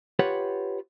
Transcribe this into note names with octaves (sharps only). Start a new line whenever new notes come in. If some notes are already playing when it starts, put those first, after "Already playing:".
F4 G4 B4 C#5 F#5